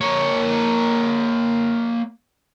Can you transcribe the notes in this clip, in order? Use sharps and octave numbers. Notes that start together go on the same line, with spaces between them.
A#3 C#5